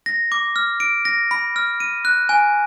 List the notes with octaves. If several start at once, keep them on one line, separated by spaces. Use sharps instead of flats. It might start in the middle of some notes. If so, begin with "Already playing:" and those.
A#6
D6
F6
D7
A#6
B5
F6
D#7
F#6
G#5